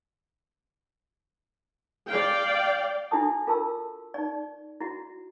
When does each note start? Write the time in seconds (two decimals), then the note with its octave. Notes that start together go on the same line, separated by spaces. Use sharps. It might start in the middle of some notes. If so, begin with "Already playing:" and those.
2.07 D5 F5 G5
3.11 D4 E4 F#4 A4 A5 D#6
3.47 F4 A4 A#4 A5 C6 E6
4.14 D#4 D5
4.81 E4 F#4